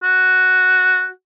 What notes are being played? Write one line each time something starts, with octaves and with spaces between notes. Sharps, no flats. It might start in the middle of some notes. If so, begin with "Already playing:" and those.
F#4